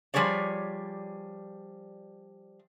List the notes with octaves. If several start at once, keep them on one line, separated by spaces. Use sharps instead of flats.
F3 G3 G#4 C#5 D5